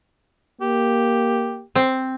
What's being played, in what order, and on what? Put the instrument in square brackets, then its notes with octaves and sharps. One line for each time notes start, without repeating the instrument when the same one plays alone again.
[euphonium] A#3 [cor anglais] G4
[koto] C4